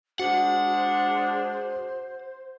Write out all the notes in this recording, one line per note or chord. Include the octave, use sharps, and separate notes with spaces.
G#3 D4 F#4 C5 F#5